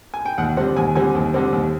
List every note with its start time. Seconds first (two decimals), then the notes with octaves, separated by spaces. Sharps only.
0.14 G#5
0.26 G5
0.38 D#2 F#5
0.57 D3 G3 C4 F#5
0.76 D#2 G#5
0.95 D3 G3 C4 G#5
1.15 D#2
1.34 D3 G3 C4
1.53 D#2